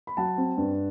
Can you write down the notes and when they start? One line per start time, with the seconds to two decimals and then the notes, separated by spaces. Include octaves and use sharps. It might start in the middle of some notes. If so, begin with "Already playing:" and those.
0.07 B5
0.17 F#3 F#5 A5
0.38 C4
0.58 G2